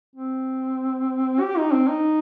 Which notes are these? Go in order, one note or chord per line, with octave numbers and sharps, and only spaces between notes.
C4
G4
D#4
C4
D#4